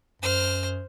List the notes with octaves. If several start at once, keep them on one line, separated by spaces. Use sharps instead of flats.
F#2 C5 F6